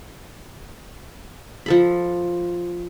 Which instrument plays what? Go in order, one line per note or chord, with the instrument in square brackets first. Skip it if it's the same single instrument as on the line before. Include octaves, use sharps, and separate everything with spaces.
[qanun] F3 A4 B5